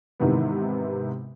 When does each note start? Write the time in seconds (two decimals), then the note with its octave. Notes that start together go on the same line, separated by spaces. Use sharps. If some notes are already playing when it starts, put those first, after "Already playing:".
0.20 G#2 C3 D#3 E3 B3